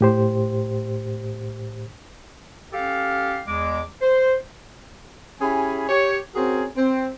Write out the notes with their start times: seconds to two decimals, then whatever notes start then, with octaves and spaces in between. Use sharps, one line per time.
0.01 A2 G4 C5
2.73 C#4 G4 A4 F5
3.48 E2 G#3 D6
4.02 C5
5.41 C#4 E4 G4 G#4 G#5 B5
5.89 G4 C#5
6.35 C4 C#4 F#4 G#4 A#4 G#5
6.76 C4